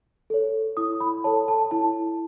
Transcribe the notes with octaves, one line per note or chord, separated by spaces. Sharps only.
A4 C#5
E4 D#6
B5
A4 C#5 A5
A5
E4 A5